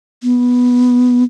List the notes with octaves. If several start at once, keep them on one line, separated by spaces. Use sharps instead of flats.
B3